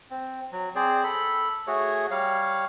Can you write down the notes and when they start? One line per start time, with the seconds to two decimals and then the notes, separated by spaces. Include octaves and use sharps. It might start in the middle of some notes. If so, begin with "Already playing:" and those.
0.11 C4
0.52 F#3
0.76 C4 G#4 C5 D5
1.04 A4 B5
1.67 A3 F#4 G#4 C#5
2.11 G3 C#5 F5